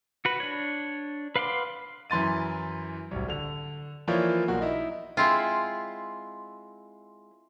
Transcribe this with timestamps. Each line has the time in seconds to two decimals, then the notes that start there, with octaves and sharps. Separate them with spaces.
0.25 F#4 B4
0.40 D4 C#5
1.36 B4 F5 F#5 C6 D6
2.10 F#2 E3 C6 A6 D#7
3.11 D1 C2
3.28 D3 F7
4.08 E3 F3 A#3 F4 C#5 D5
4.48 B1 A#3 F#4
4.61 D#4 E4 E5
5.17 G#3 C4 E4 F4